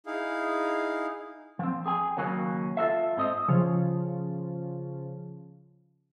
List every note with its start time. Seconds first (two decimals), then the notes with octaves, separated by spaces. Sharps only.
0.06 D#4 E4 G#4 F5
1.59 F3 C4
1.86 G#4 G5 G#5
2.17 D#2 C#3 F#3 A#3 C#4
2.77 F4 F#4 A4 E5
3.17 G#2 C4 D#5
3.49 C#3 F3